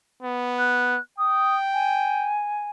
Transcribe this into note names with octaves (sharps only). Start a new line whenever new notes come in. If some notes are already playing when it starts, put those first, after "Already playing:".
B3
F#6
G5 D#6
G#5